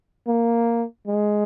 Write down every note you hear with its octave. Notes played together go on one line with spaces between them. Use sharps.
A#3
G#3